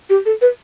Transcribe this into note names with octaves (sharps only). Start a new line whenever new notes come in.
G4
A4
B4